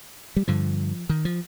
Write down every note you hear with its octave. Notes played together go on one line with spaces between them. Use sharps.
G3
G2 D3 F3
D#3
F3